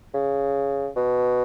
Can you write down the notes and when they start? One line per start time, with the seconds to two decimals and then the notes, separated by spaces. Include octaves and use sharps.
0.14 C#3
0.96 B2